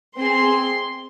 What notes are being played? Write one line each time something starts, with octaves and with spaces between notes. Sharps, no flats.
C4 G#4 C6